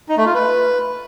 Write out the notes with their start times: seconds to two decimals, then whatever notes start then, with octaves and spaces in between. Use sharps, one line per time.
0.09 D#4
0.17 A3
0.26 F4
0.35 B4